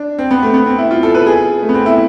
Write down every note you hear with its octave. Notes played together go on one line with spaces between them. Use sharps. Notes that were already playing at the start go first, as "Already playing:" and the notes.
Already playing: D4
C4
B3
A3
B3
C4
E4
F4
A4
B4
G#4
A3
B3
C4
E4